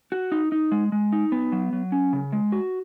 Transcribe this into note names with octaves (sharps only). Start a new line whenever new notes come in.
F#4
D#4
D#4
G#3
G#3
D#4
B3
F#3
F#3
C#4
C#3
G#3
F#4